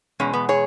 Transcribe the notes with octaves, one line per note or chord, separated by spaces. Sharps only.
E2 B2 G#3 C#4
B3
G#4 C#5